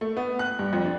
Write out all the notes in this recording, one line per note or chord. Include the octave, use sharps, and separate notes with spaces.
A3
B3
F#6
G2
F2
D4